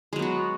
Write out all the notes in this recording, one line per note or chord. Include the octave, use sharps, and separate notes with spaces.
F#3 G#3 B3 F#4